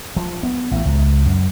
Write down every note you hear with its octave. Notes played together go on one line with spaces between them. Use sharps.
F3
B3
A1
C#2
F#2